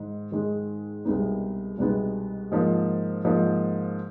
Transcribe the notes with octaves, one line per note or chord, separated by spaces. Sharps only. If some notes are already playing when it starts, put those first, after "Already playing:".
Already playing: G#2 D#3
G#2 D#3 G#3
C2 B2 G#3 B3 D#4
C2 B2 G#3 B3 D#4
G#2 F3 A#3
G#2 F3 A#3